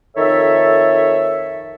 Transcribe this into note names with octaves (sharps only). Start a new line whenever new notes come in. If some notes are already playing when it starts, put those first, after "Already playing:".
F2 D#3 A4 C#5 E5